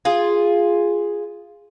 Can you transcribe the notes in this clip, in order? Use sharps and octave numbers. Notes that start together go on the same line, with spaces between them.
F4 G#4